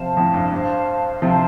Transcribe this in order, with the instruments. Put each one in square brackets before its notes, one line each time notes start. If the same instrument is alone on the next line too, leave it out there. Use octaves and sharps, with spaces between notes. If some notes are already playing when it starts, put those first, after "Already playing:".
Already playing: [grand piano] C3 F3 [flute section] C5 F5 A5
[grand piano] F2 A2
G2
[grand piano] G2 [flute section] C5 F5 A5
[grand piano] C3 F3 [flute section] C5 F5 A5